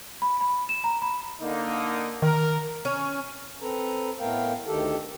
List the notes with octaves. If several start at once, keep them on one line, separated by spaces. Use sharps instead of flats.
B5
B5
E7
A#5
B5
D3 A#3 D#4
D#3 A#4
C#4
C4 A4 B4 A#5
A2 A3 B3 A#4 F5 G5
D2 D#3 G4 A4